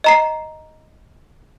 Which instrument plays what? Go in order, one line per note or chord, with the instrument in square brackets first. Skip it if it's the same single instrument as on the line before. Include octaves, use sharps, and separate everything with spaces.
[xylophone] D#5 A#5 C7